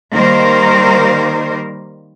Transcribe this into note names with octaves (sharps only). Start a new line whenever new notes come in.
D#3 G3 A#3 D#4 A#4 C5